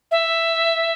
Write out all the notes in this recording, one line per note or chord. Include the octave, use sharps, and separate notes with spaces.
E5